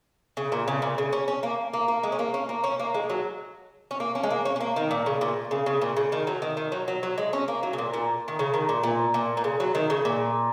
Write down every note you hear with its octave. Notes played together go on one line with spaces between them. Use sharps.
C#3
A#2
C#3
A#2
C#3
C#4
C#4
A#3
A#3
A#3
G#3
C#4
A#3
C#4
A#3
C#4
A#3
G#3
F#3
C#4
A#3
C#4
G#3
A#3
C#4
C#4
A#3
D#3
A#2
C#3
A#2
C#3
C#3
A#2
C#3
D#3
F#3
D#3
D#3
F#3
F#3
F#3
G#3
C#4
A#3
F#3
C#3
A#2
A#2
D#3
C#3
D#3
A#2
A#2
A#2
A#2
C#3
F#3
D#3
C#3
A#2